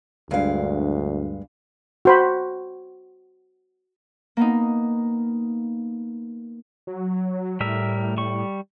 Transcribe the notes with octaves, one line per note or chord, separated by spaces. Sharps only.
D2 G2 G#3 F5
F#4 C5 B5
A#3 B3 D#4
F#3
A2 G3 A#4 E5
G3 C#6